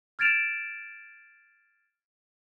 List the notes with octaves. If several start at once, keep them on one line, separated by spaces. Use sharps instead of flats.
F6 G#6 A6 D7 E7 F7